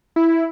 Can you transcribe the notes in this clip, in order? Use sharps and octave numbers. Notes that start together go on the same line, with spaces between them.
E4